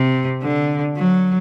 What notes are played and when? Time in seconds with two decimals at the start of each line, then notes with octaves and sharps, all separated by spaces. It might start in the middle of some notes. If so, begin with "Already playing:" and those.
Already playing: C3
0.43 D3
0.97 F#3